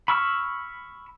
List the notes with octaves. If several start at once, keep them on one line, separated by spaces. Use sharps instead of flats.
B5 C#6 E6 F6